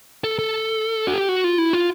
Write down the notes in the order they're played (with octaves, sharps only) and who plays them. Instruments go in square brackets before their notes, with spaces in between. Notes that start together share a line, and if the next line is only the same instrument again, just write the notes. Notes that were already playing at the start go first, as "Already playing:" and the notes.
[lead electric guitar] A4
A4
F#4
G4
F#4
F4
E4
F4